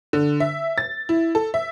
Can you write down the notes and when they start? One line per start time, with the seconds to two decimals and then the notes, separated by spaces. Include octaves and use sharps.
0.13 D3
0.40 E5
0.78 A6
1.09 E4
1.35 A4
1.54 E5